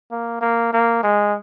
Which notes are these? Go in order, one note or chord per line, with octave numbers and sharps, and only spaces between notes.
A#3
A#3
A#3
G#3